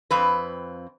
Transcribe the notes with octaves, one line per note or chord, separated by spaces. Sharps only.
F2 C4 B4